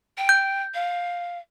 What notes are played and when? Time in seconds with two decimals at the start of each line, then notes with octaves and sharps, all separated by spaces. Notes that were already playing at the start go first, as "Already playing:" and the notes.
0.17 G5
0.29 G6
0.74 F5